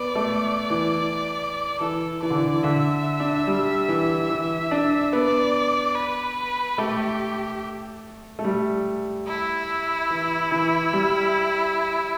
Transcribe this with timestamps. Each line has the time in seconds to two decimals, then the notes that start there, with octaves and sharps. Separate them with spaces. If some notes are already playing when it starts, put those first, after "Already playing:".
Already playing: B3 D5
0.15 A3
0.70 E3
1.80 E3 A4
2.23 E3 D5
2.30 D3
2.37 E3
2.63 D3 E5
3.20 D4
3.47 G3
3.88 E3
4.30 E3
4.71 D4
5.13 B3 D5
5.95 B4
6.78 A3 G4
8.39 A3
8.45 G3
9.27 E4
10.10 E3
10.51 E3
10.93 G3